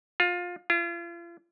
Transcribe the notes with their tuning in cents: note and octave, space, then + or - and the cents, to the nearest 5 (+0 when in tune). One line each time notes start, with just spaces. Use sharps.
F4 +20
F4 -40